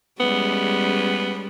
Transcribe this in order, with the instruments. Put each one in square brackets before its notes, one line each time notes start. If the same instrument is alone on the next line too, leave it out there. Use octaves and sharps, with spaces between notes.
[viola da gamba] G3 G#3 C#4 [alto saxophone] B3